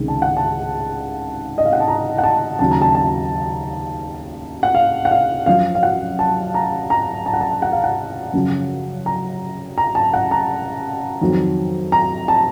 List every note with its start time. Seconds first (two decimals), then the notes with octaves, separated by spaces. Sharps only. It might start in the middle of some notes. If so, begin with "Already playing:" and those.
Already playing: C#2 C3 D#3
0.08 A5
0.22 F#5
0.37 A5
1.58 D#5
1.66 F5
1.73 F#5
1.80 A5
1.88 A#5
2.18 F#5
2.24 A5
2.59 D#2 C#3 F#3 A5
2.71 A#5
2.82 A5
2.95 A5
4.63 F#5
4.75 F5
5.05 F#5
5.11 F5
5.46 F#2 F3 F5
5.75 F5
5.83 F#5
6.19 A5
6.54 A#5
6.90 A#5
7.26 A5
7.34 F#5
7.41 A5
7.62 F#5
7.72 F5
7.84 F#5
8.33 F#2 C#3 F3
9.06 A#5
9.78 A#5
9.95 A5
10.13 F#5
10.31 A#5
11.21 F2 D#3 F#3
11.92 A#5
12.28 A5